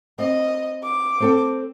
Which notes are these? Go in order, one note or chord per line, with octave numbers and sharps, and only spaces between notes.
C4 D#5
D6
C4 A4 G5